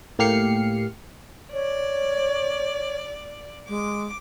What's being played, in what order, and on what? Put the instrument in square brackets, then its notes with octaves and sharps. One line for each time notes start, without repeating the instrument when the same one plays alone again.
[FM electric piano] A2 A#3 G4 F6 C7 C#7
[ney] C#5 [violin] D5
[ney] G#3 [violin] D6